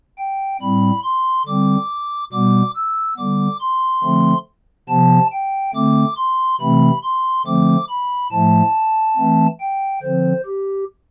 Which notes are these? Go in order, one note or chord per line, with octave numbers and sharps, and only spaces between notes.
G5
A2 G3 C4 B5
C6
D3 G3 C4 D6
B2 G3 B3 D6
E6
D3 G3 B3 D6
C6
D3 F3 A3 C4
C3 F3 B3 A5
G5
D3 A3 C4 D6
C6
C3 E3 A3 C4 B5
C6
D3 F3 A3 C4 D6
B5
A2 F3 A3 A5
E3 A3 C4
G5
D3 F3 C4 C5
G4